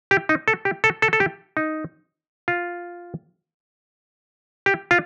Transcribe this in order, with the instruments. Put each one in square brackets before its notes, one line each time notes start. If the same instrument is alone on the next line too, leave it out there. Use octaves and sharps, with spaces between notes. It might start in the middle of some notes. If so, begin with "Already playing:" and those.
[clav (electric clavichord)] G4
D#4
A4
G4
A4
A4
A4
G4
D#4
F4
G4
F4